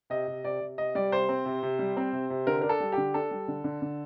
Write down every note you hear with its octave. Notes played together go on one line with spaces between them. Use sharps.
C3 D#5
C3
C3 D5
C3
C3 D#5
G3 D5
C3 C5
C4
C3
C3
G3
C4
C3
C3
D3 A#4
D4 A#4
A4
G3
G4
D3
D4 A4
G3
D3
D3
D3